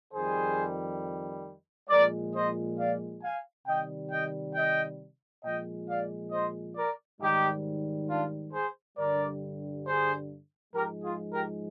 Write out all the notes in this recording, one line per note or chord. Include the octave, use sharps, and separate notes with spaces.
F2 D#3 G3 G#4 C5
A#2 F3 G#3 A#4 D5
C5 D#5
D5 F5
F5 G#5
C3 D#3 G3 D#5 G5
D#5 G5
D#5 G5
A#2 F3 G#3 D#5 G5
D5 F5
C5 D#5
A#4 D5
G#2 D#3 G3 D#4 G4
D4 F4
G#4 C5
G2 D3 G3 A#4 D5
G#4 C5
G#2 F3 G#3 G4 A#4
F4 G#4
G4 A#4